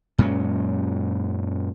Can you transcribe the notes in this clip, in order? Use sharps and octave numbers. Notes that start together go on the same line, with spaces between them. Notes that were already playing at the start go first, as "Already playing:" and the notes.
F#2 A#2 G#3 C#4